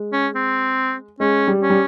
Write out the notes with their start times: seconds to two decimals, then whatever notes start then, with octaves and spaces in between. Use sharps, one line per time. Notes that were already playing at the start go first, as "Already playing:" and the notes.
Already playing: G#3
0.13 C#4
0.35 C4
1.20 G#3 C#4
1.48 G3
1.62 C#4
1.70 G3